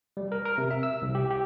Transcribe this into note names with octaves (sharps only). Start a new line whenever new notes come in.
G3
A#4
A#4
C3
E5
E6
C2
G4
G4